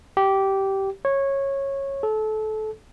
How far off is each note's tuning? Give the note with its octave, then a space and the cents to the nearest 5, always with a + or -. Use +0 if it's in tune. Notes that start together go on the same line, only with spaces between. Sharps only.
G4 -15
C#5 -15
A4 -25